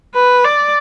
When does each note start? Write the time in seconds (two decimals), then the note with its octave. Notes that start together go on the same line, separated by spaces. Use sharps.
0.14 B4
0.44 D5